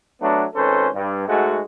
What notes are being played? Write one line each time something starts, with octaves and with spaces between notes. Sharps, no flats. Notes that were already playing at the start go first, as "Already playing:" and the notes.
F#3 A3 B3 D4
G#1 C#4 A4 B4 C5
G2
G#2 G#3 A3 F#4